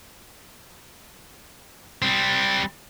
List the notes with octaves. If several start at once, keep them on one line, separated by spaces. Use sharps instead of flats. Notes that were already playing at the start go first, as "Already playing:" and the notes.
G3 C4